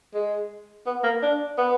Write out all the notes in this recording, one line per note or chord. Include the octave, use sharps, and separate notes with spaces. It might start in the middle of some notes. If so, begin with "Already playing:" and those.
G#3
B3
A#3
D4
B3